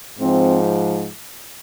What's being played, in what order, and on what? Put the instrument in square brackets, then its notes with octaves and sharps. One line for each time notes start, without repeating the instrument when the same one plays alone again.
[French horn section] G#2 F3 C4